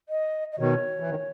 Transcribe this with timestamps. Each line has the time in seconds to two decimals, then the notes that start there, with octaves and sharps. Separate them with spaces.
0.09 D#5
0.52 D#5
0.59 B2 D#3 C#5
1.00 E3
1.10 B2 D#3